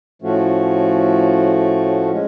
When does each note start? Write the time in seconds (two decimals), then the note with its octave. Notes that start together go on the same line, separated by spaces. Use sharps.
0.22 A2 F3 A3 C#4 F#4
2.11 G#3 C#4